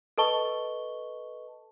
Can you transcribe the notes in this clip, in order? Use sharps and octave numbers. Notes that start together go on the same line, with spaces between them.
A4 B4 D#5 A5 C#6 G7